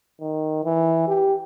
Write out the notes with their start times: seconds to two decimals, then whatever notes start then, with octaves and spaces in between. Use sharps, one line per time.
0.21 D#3
0.64 E3
1.08 G4